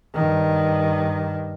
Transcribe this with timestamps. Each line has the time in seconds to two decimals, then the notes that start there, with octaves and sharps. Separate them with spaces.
0.15 G2 D#3